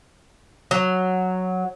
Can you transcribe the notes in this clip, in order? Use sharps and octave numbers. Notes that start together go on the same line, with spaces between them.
F#3